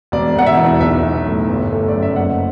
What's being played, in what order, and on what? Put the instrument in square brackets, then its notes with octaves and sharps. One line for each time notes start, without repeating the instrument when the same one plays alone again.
[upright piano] E1 D5
E1 F#5
E5
E2
B1 E5
B1
A2
G1
A3
D5
F#2
E5
F#1 F#5